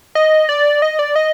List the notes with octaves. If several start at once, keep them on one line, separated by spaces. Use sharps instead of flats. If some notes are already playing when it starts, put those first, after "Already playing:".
D#5
D5
D#5
D5
D#5